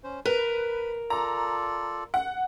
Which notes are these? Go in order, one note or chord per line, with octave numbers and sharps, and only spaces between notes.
C#4 C5
A#4 B4 B5
F4 A4 D5 A#5
F#5